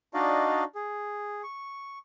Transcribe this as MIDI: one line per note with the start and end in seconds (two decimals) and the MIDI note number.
0.14 0.64 62
0.14 0.64 63
0.14 0.64 66
0.14 0.64 74
0.14 0.64 75
0.14 0.64 77
0.75 1.42 68
1.43 1.99 85